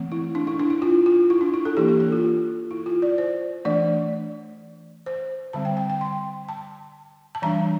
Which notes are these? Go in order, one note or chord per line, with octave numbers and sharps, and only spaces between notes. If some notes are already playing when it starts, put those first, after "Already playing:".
Already playing: E3 A3 C4
E4
D4
E4
D4
E4
F4
F4
E4
D4
E4
A4
E3 A#3 D4 G4
G4
A4
F4
E4
F4
D5
C5
E3 A3 D4 D5
C5
D3 G3 C4 A5
G5
G5
G5
C6
A5
A5
E3 G3 D4 A#5